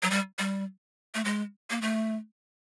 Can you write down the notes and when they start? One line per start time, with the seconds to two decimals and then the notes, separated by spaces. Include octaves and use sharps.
0.02 F#3
0.10 G3
0.39 G3
1.14 A3
1.25 G#3
1.70 A#3
1.81 A3